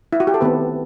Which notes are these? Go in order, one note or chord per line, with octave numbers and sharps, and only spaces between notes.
E4
F#4
G4
A4
D#3 A3 B3 C4 B4